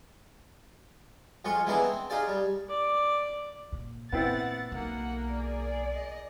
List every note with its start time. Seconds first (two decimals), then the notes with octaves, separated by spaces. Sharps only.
1.45 F2 G#3 F4 C#6
1.66 E3 G#3 B3 D4 E4 A#5
1.84 C4
2.10 D#4 F4 G#4 D5
2.28 G3
2.69 D5
3.72 A#2
4.12 A#2 B3 C4 E4 F#5 A6
4.72 B1 A#3 F#5
5.28 G#4 D5
5.94 D#5